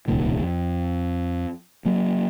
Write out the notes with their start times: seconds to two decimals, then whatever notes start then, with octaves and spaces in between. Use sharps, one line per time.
0.08 D1 C2 A#2 D#3
0.42 F2
1.85 F#3 A#3